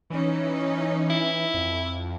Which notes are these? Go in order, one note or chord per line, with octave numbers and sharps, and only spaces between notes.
E3 C#4 D#4
E4
F2